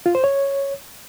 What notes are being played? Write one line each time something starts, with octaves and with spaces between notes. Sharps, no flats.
F4
C5
C#5